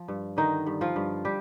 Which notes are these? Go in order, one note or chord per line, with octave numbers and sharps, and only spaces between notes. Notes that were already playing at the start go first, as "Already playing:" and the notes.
Already playing: F3
G2
D3 D#3 D#4
G2
F3 F4
G2
G3 G4